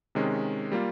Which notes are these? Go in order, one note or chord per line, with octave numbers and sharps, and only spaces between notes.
C3 D#3 G#3 C#4
G3 A#3 F4